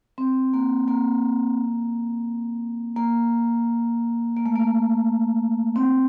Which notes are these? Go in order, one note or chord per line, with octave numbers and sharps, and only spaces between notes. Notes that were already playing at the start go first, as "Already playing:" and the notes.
C4
A#3
A#3
A#3
A#3
A3
A#3
C4